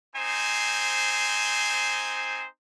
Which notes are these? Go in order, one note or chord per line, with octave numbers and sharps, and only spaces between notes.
C4 D#4 C5 G#5